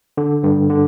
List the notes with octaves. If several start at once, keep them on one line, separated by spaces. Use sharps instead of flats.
D3
G2
D3